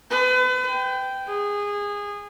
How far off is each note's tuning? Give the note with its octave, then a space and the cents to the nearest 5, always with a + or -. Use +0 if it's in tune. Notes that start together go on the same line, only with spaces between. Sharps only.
B4 +40
G5 -5
G#4 -20